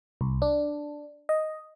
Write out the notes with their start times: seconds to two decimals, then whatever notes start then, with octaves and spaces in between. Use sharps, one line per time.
0.21 C2
0.42 D4
1.29 D#5